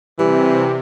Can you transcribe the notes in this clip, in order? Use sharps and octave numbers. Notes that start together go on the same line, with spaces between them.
C3 E3 G3